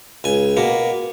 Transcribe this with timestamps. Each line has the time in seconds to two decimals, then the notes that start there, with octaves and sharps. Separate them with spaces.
0.24 C#2 G#5
0.57 B2 A#3